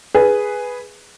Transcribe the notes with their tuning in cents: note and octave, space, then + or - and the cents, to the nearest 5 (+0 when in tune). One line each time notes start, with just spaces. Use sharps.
G#4 +0 B4 +0